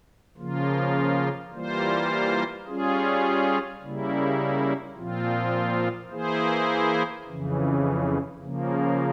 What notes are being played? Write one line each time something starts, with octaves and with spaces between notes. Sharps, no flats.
C#3 F3 A#3 F4
E3 G3 A#3 F4 C5
G3 C#4 F4 G#4
C#3 G3 A#3 E4
A#2 F3 C4 F4
E3 A#3 E4 G#4 C5
F2 C#3 E3
C#3 F3 A#3